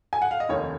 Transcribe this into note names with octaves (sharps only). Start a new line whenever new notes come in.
G#5
F#5
F5
D#5
F1 D#2 D#3 C#5